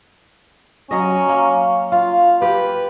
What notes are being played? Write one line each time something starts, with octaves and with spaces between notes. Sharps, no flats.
F#3 C#4 D#5
A#3
F4 F5
G4 B4